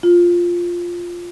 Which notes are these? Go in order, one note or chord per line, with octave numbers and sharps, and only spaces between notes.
F4